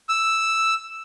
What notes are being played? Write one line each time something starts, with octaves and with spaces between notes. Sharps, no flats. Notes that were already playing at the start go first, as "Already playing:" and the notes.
E6